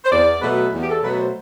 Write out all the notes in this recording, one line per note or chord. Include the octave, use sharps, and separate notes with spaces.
C5
E2 D5
B2 F#3 A3 B4
E2
G4
A4
B2 F#3 A3 B4
C5